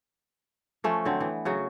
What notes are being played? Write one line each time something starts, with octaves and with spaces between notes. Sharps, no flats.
F3 A3 C#4
D3 F#3 C4
E3 B3
C#3 F#3 F#4